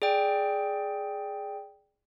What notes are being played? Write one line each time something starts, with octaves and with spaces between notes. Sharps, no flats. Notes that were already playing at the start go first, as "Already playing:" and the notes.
G#4 D5 G5